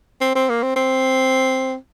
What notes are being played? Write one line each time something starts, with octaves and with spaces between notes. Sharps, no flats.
C4
C4
A#3
C4
C4